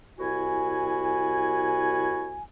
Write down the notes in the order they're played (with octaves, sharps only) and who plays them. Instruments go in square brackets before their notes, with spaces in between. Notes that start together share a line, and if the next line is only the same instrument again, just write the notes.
[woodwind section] C2 E4 F#4 G#5